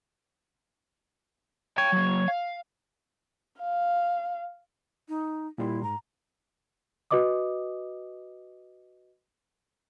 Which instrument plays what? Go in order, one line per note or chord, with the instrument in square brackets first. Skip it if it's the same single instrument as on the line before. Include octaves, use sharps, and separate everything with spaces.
[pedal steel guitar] C#5 [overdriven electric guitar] G5 A5
[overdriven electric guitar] F#3 A#3
F5
[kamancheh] F5
[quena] D#4
[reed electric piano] A#2 G3 C6 [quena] E4
[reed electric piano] G#2 [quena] A#5
[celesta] F#4 B4 D#5 D6 D#6